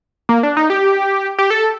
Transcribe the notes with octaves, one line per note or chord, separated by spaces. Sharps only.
A#3
D4
D#4
G4
G4
A4